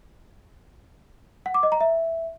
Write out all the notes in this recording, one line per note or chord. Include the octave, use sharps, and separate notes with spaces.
F#5
D6
D#5
A#5
E5